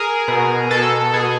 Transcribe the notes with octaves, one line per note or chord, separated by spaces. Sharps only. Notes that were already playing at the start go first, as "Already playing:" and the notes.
Already playing: G#4 A#4
B2
B2 A4
B2 G#4